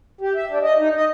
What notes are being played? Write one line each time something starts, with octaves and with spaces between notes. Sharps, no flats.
G4
E5
D4
D#5
D#4
D#5